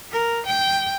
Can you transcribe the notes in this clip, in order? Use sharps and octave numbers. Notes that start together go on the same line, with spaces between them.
A#4
G5